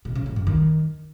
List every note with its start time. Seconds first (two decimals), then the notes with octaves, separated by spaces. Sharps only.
0.05 B2
0.15 C#3
0.26 A2
0.36 F#2
0.47 D#3